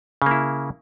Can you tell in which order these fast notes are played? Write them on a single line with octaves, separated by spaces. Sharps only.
C#3 A#3 E4